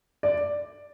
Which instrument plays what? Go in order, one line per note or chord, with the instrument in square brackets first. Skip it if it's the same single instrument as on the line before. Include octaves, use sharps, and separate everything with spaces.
[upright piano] D5